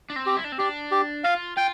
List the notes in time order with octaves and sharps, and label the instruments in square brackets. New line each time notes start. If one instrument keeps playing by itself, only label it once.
[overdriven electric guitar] D4
C4
[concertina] G4
[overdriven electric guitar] E4
D4
C4
[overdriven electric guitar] D4 [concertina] G4
[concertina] G4
[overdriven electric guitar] F4 [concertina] F5
[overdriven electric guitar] F4 [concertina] G5